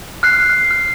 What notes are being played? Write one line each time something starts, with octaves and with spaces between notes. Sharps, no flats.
F6 F#6 C7
F6